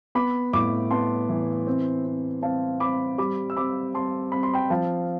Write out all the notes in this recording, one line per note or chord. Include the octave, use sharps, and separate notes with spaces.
B3 B5 D6
A2 B5 D6
B3 A5 C6
E3
C4
C4
C4 F5 A5
C4 B5 D6
G3 B5 D6
E6
C4 B5 D6
C4 A5 C6
C4 B5
C6
G5 B5
F3 F5 A5